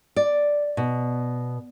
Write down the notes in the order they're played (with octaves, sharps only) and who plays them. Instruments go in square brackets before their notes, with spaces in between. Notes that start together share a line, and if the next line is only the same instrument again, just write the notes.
[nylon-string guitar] D5
B2